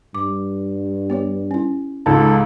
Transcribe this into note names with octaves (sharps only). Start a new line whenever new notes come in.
G2 D6
B3 G4 C#5
C#4 E4
C#2 G#2 D#4 A4